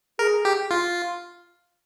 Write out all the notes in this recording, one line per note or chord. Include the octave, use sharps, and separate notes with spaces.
G#4 A#4
G4
F4